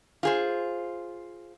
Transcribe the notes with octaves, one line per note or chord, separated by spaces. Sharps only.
F4 G#4 C5